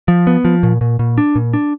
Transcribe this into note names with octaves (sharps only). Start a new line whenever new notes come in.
F3
B3
F3
A#2
A#2
A#2
D4
A#2
D4